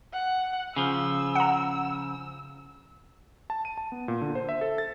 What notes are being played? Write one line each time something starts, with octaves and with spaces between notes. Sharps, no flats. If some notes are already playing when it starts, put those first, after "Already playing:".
F#5
C#3 F3 E6
F#5 A#5
A5
D#7
A5
B3
A#2
D3
C5
E5
A4
A6